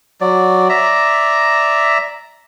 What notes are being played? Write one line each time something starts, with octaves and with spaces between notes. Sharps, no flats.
F#3 D5
D5 E5 A#5